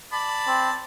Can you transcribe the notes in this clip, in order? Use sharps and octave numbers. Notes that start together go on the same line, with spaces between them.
D5 A5 B5
C4